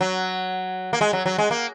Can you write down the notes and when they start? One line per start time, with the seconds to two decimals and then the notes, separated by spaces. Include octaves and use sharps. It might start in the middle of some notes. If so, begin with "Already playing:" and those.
0.01 F#3
0.93 A#3
1.01 G#3
1.13 F#3
1.26 F#3
1.38 G#3
1.51 A#3